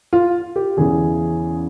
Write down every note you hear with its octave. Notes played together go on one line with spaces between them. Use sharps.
F4
G4
E2 C#3 E3 G#4